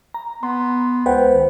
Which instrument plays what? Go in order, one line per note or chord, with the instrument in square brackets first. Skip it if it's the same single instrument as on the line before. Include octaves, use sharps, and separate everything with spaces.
[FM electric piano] A#5
[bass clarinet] B3 [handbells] C6
[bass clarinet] C#2 [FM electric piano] B4 [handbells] C5 F#5 G5
[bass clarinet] D#3